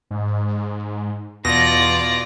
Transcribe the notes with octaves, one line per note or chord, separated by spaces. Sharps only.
G#2
E2 B2 F4 D5 A#6